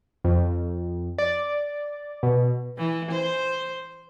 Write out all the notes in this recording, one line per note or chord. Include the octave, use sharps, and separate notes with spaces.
F2
D5
B2
E3
C5